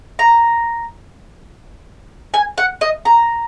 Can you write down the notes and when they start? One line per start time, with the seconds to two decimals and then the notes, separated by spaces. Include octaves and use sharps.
0.19 A#5
2.34 G#5
2.58 F#5
2.81 D#5
3.05 A#5